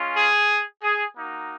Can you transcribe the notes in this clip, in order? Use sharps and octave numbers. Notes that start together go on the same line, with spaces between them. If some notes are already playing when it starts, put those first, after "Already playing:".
Already playing: G#3 C#4 F4
G#4
G#4
A#3 D#4 F#4